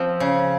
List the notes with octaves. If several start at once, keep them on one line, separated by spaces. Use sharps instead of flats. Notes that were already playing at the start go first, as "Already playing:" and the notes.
Already playing: F3 C4
C#3